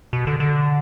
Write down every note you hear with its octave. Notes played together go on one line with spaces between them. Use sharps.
B2
D3
D3